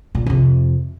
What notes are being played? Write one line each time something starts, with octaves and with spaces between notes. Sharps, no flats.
A#2
F2 C3